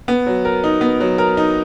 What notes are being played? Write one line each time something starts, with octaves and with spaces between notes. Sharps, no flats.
B3
F#3
A#4
D#4
B3
F#3
A#4
D#4